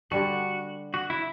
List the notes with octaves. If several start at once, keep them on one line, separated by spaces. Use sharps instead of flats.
D3 G3 D4 F#4 A4
F#4
E4